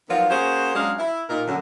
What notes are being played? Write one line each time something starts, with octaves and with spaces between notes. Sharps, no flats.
D#3 F3 F#3 A#3 B3 F4
A#3 C#4 F#4 G#4 C5
F#3 G#3 C#4 D4 D#5 F5
E4
A#2 D#4 A#4
F#2 D3